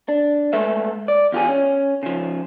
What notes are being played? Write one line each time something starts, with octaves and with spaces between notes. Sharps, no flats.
D4
G#3 A3 B4 E5
D5
E2 F4 G4 G#4
C#4
C#3 F3